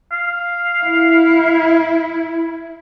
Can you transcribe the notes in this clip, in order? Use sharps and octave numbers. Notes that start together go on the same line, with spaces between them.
F5
E4